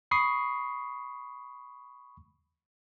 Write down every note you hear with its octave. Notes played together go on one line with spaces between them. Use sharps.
B5 C#6 D#6 C7